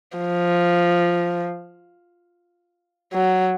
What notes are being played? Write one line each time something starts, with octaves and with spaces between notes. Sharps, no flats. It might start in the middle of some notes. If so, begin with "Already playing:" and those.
F3
F#3